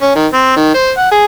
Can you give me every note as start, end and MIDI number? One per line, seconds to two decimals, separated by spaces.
0.02 0.11 61
0.15 0.26 51
0.33 0.53 60
0.56 0.70 51
0.74 0.91 72
0.97 1.10 78
1.11 1.25 68